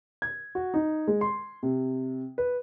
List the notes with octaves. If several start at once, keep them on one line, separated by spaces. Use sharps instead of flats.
G#6
F#4
D#4
G#3
C6
C3
B4